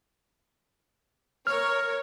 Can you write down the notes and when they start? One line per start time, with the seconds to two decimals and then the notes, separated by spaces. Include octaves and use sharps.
1.47 A#4 C#5 F6